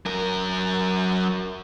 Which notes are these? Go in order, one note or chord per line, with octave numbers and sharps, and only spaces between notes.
F#3 A#4